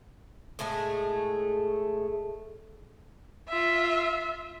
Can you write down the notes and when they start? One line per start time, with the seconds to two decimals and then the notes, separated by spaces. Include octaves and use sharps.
0.59 A2 G#3 A3 G#4
3.49 F4 E5